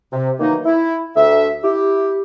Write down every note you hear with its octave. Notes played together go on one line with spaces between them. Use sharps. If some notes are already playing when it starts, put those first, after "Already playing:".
C3
D#3 E3 F#3 A#3 D#4
E4
D2 E5
E4 G4